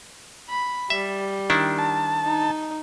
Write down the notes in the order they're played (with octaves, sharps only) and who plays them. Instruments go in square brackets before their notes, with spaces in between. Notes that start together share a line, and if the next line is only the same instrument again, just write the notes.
[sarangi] B5
[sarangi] G3 [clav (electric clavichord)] E5
[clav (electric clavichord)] D#3 D4 E4
[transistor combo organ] A5
[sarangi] D#4